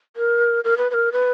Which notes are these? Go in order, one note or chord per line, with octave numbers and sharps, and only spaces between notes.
A#4
A#4
B4
B4
A#4
B4